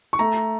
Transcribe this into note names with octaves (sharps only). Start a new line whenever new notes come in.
C#6
A3 A#5